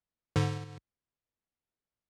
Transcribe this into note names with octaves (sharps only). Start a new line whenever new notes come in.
G#2 D3